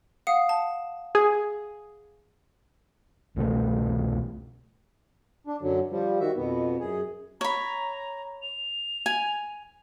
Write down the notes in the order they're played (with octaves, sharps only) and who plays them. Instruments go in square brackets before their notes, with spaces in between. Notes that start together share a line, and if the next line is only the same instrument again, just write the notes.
[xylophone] F5 F#5 D#6
A5
[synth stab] G#4
[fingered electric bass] C2 B2 G3 A3
[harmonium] D4
F#2 D3 F#3
F3 G3
D#3 F#4 E5
F2 B2 B3
F#2 G#4
[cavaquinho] C#5 B5 [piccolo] A#5
[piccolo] F7
[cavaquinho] G#5